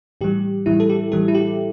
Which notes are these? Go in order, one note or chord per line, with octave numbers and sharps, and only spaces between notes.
A2 E3 G3 G4
A2 E3 G3 E4
A4
G4
A2 E3 G3 A4
E4
G4